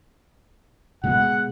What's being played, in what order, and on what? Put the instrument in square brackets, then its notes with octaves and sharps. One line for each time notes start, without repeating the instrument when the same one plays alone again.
[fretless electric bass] B2 G#3 [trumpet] F#5